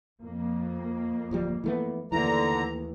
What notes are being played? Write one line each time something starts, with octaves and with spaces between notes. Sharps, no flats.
F2 A#3
D1 F3 G3
E3 A3 B3
D#2 D3 E3 A3 A#5